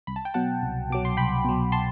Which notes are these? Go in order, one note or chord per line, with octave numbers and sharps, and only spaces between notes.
C2 B5
A5
G5
B2 F#3 F#5 A5
C2
B2 F#3 D6
C6
C2 G5 B5
B2 F#3
A5 C6